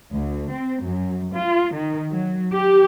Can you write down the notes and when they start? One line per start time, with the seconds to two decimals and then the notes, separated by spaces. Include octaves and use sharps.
0.12 D2
0.49 C4
0.80 F#2
1.34 F4
1.72 D#3
2.12 F#3
2.53 G4